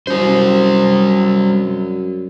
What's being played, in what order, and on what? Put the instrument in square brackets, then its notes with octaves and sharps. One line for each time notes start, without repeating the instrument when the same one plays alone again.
[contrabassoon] F#2 [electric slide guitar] G3 C5